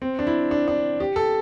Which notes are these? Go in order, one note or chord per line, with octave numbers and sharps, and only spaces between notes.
C4
D4
E4
D4
D4
G4
A4